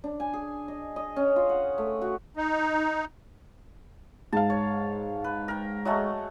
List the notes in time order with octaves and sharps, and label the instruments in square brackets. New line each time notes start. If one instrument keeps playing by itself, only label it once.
[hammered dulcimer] D4
G#5
G#4
D#5
D#5
C#4
F4
F#5
A3
F#4
[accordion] D#4
[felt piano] G#2 F5 [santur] A5
[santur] C#5
B4
A#4 G5
F#3 G#3 A3